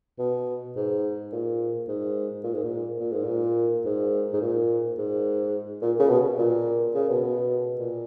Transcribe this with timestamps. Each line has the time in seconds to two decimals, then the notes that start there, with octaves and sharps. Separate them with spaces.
0.19 B2
0.76 G#2
1.32 A#2
1.88 G#2
2.44 A#2
2.54 G#2
2.64 A#2
3.00 A#2
3.12 G#2
3.25 A#2
3.85 G#2
4.33 G#2
4.41 A#2
4.98 G#2
5.82 A#2
5.99 C#3
6.09 B2
6.38 A#2
6.94 C#3
7.09 B2
7.23 B2
7.79 A#2